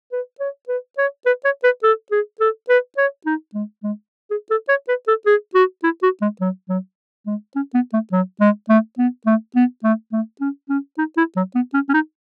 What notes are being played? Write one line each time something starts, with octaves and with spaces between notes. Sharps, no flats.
B4
C#5
B4
C#5
B4
C#5
B4
A4
G#4
A4
B4
C#5
D#4
G#3
G#3
G#4
A4
C#5
B4
A4
G#4
F#4
E4
F#4
G#3
F#3
F#3
G#3
C#4
B3
A3
F#3
G#3
A3
B3
A3
B3
A3
A3
C#4
C#4
D#4
E4
F#3
B3
C#4
C#4
D#4